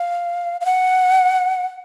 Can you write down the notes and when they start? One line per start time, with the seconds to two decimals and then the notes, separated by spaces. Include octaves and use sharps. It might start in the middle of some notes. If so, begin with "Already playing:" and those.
Already playing: F5
0.61 F5
0.65 F#5